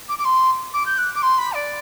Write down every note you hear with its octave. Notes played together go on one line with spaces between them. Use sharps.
D6
D6
C6
D6
G6
F#6
D6
C6
B5
D5